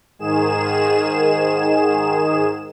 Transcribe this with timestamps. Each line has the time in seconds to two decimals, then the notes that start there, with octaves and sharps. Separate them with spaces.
0.19 G#2 D#3 G#4 E7